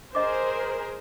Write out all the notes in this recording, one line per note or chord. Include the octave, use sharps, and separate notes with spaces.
G#4 A#4 C5 D#5 D6